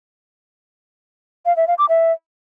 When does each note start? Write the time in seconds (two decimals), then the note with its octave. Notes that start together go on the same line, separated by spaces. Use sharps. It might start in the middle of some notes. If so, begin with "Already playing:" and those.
1.46 F5
1.57 E5
1.67 F5
1.78 D6
1.89 E5